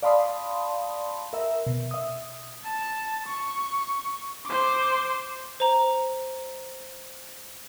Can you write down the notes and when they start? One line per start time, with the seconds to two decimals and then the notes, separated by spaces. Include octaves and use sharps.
0.03 D5 F5 A5 B5 C6 D#6
1.33 A#4 E5
1.67 B2
1.91 E5 D#6
2.64 A5
3.26 C#6
4.45 C5 D6
5.60 C5 A#5